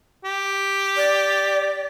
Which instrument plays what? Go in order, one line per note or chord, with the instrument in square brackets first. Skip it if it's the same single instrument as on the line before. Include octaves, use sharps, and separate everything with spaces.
[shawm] G4
[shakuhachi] D5